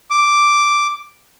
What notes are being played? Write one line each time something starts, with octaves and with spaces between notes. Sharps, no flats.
D6